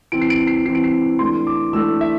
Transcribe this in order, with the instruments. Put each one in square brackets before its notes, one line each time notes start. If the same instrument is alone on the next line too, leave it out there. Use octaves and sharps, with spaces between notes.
[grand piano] E3 C4 D7
C7
D7
C7
E3 C4 C7
D7
C7
E3 A3 D4 C6
D6
E3 A3 D4 E6
E5